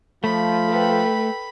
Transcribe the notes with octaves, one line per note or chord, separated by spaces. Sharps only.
F3 A3 B5
A4 B4 G5